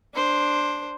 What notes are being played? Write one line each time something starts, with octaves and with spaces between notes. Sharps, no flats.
D4 C5